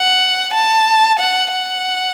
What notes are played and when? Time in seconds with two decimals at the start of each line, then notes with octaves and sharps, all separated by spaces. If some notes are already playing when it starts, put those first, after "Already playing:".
Already playing: F#5
0.54 A5
1.19 F#5
1.52 F#5